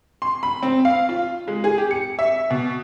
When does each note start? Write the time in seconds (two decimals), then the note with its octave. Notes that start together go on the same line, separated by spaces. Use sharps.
0.22 C6
0.43 B5
0.63 C4
0.85 F5
1.09 F4
1.48 G#3
1.64 G#4
1.78 G4
1.91 C#7
2.19 E5
2.51 B2